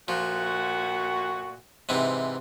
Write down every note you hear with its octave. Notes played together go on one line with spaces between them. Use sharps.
A#2 F3 A3 F#4
G#2 C3 E3